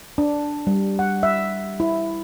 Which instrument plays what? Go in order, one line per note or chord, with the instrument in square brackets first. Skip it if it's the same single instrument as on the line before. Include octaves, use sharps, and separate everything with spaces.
[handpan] D4
G3
F#5
E5
E4